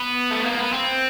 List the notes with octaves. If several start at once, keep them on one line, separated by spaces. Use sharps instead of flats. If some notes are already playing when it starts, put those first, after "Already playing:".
Already playing: B3
A3
A#3
B3
C4